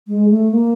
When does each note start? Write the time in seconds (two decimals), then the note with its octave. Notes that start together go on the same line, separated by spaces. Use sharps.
0.08 G#3
0.29 A3
0.51 A#3